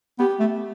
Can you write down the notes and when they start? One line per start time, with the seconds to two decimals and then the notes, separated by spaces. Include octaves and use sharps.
0.19 B3 G4
0.40 A3